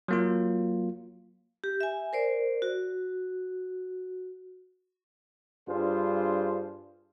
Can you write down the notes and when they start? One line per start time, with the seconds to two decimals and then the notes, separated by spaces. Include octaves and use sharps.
0.08 F#3 A#3 F4
1.64 G4
1.81 E5 G#5
2.13 A#4 C5 D5
2.62 F#4
5.69 G2 G3 D4 F4 G#4 C5